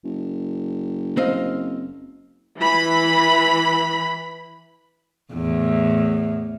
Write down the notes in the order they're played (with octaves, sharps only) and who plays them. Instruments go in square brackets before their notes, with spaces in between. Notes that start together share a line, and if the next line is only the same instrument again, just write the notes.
[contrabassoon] F#1
[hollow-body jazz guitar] C4 D#5 F5
[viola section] E3 B5
[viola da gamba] E2 A2